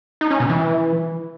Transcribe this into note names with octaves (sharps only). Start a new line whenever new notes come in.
D#4
C#4
B2
E3